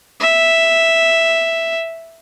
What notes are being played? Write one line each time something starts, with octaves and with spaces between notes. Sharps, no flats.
E5